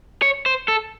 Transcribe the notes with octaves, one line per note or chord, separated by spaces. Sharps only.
C#5
C5
A4